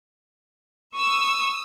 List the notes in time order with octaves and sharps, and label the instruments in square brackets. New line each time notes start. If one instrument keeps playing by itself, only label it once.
[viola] C#6 [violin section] D#6 E6